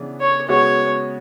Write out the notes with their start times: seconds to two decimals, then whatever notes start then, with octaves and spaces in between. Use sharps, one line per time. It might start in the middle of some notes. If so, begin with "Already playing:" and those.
Already playing: C#3 E3 B3 D4
0.20 C#5
0.48 C#3 G#3 B3 F#4 C#5